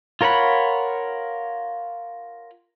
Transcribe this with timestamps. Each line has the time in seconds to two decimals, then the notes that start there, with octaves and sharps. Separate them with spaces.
0.21 F4 A#4 C#5 F#5 B5